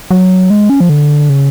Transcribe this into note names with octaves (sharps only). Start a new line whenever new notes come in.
F#3
G#3
C#4
F3
D3
C#3